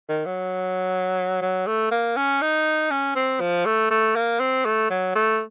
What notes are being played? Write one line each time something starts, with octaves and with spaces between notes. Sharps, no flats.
D#3
F#3
F#3
A3
A#3
C#4
D#4
C#4
C4
F3
A3
A3
A#3
C4
A3
F#3
A3